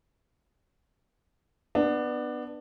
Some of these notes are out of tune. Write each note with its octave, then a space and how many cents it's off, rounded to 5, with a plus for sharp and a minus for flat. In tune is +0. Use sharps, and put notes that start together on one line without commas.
B3 +0 D4 +20